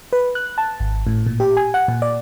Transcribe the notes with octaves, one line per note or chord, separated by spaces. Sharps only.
B4
F#6
A5
G#1
A2
A#2
G4
G#5
F#5
A#2
D5